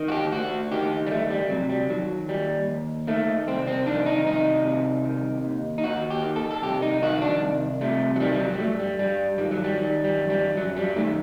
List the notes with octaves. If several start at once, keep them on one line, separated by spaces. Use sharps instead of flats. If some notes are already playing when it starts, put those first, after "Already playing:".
Already playing: D#3
F#4
G4
D2 F#4
D#3 G4
G3
D2 A3
G3
C3 F#3
G3
D#3 F#3
D#2 G3
D#2
D#3 A3
C2 C4
C4
D#3 D4
D#4
C2 D#4
C3
D#3
D#2
D#4
D#2 F#4
G4
D#3
A4
A4
C2 G4
D#4
D#3 F#4
D4
C2
C3 A3
F#3
D#3 G3
G3
F#3
G3
G2 A3
G3
G2 G3
D#3 G3
F#3
G3
D#3 G3
G3
F#2
G3
F#2 F#3
G3
D#3 A3